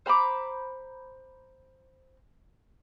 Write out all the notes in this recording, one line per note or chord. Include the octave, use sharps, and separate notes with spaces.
C5 A#5 B5 D6